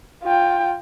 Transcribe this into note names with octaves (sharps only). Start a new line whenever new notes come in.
F4 G5